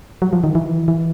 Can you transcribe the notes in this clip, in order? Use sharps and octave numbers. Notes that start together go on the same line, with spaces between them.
F#3
F3
D#3
E3
E3